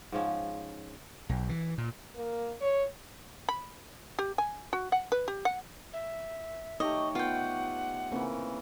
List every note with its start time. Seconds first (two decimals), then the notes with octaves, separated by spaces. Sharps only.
0.12 G#2 F3 C#4
1.29 B1
1.49 E3
1.78 A#2
2.16 A#3
2.61 C#5
3.49 B5
4.19 G4
4.38 G#5
4.73 F#4
4.92 F#5
5.12 B4
5.28 G4
5.45 F#5
5.93 E5
6.80 A3 D#4 G4 C#5 D#5
7.15 B3 F4 B4 F#5 G5
8.12 C#3 E3 A#3 C4 A#4